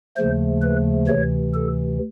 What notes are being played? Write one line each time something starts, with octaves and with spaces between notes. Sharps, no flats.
D#2 C#3 F3 A3 C5
B4
D2 C3 E3 C#5
A4